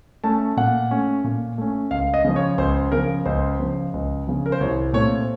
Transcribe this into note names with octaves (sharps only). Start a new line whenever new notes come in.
A3 C#4 A5
A#2 F#5
A3 C#4
A#2
A3 C#4
C#2 F5
D#5
C#3 F3
C#5
C#2 C5
C#3 F3 A#4
C#2 C5
C#3 F3
C#2
C#3 F3
A#4
C5
C2 C#5
A#2 A3 C4 C#5